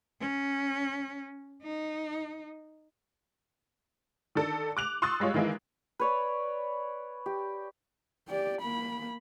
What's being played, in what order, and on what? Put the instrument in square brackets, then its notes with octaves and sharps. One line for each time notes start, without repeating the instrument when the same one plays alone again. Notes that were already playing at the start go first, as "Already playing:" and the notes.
[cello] C#4
D#4
[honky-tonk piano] D#3 D4 A4
D6 F#6 F7
C6 C#6 D#6 E6 F#6 A6
G3 G#3 F4 C#5
D#3 E3 G#3 A#3 E4
[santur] B4 C#5 D5
G4
[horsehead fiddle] G4 D5
A#3 B5